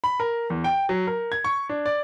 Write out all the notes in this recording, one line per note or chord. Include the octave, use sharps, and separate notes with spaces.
B5
A#4
E2
G5
F#3
A#4
G#6
C#6
D4
D5